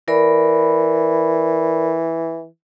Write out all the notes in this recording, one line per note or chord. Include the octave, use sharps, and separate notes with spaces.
E3 A#4 D5 B5